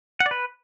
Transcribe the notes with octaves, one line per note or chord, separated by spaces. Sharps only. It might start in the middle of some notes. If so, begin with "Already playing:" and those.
F#5
D5
B4